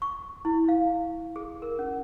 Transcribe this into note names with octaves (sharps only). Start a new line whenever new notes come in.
C#6
E4
F5
G#4
A#4
C#4